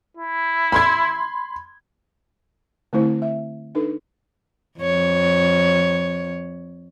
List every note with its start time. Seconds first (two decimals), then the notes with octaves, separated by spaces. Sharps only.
0.17 E4
0.72 B5 C6 G#6
2.93 D3 A3 C4 E4 C5
3.22 E5
3.75 D4 D#4 A4 B4
4.80 F2 C#5